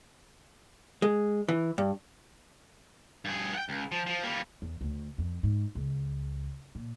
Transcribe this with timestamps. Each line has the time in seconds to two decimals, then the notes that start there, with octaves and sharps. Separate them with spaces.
1.02 G#3
1.48 E3
1.78 G2
3.25 G2 G#4
3.54 F#5 G5
3.69 C#2
3.92 F3
4.06 F3
4.23 G3 A#3
4.62 E2
4.81 D2
5.18 F2
5.43 G#2
5.75 C#2
6.75 A#2